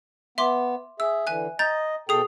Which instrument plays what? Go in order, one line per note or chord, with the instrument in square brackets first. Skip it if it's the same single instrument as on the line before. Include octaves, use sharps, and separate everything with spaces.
[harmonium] B3 [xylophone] E5 C6 D6
[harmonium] G#4 E5 [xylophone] E6
[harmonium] D3 E3 [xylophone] E5 G#5 F#6
[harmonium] D#5 [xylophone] A#5 G6 A6
[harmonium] B2 A4 G5 [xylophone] G#4 D#6 C7